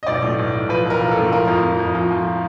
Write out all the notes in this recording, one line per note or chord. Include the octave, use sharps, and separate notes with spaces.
D#5
B1 D5
A2
B1
B1
F3 B4
B1 A#4
F3
A4
A2
F3 A#4
F2
F2
F2
F3
F3